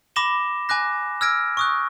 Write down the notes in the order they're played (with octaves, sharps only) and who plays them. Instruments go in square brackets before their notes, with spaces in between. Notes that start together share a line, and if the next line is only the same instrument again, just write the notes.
[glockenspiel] B5 D6 A#6 E7 G7
G#5 D6 F#6 A#6
E6 F6 G#6 A#6 D7
C#6 D#6 F#6